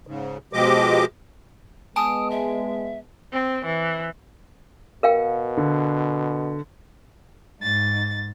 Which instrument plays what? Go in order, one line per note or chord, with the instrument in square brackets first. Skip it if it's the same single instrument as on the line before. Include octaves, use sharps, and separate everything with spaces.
[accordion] G#2 C#3
B2 F3 G#3 G4 D#5 D6
[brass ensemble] G#3 B3 [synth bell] G#5 A5 D7 [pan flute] D#6
[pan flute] E5
[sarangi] C4
E3
[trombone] B2 [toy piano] A#4 F5 G5
[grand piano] D3
[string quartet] G#2 A6